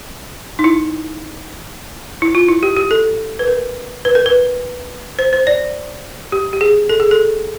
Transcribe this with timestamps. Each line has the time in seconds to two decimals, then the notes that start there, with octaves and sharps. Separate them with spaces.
0.59 D#4
0.64 E4
2.22 E4
2.35 F4
2.49 E4
2.63 G4
2.77 G4
2.91 A4
3.39 B4
3.48 A#4
4.05 B4
4.15 A#4
4.26 B4
5.19 C5
5.33 C5
5.47 D5
6.32 G4
6.53 G4
6.61 G#4
6.89 A4
7.00 G#4
7.11 A4